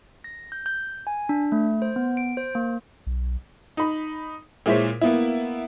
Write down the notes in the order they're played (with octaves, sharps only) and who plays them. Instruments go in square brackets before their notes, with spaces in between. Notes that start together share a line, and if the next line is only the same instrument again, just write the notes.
[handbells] A#6
G6
G6
G#5
D4
A3
C5
B3
D7
C5
A#3
[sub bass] B1
[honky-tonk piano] D#4 B5
A#2 G#3 E4 C5 C#5 B6
A#3 B3 E4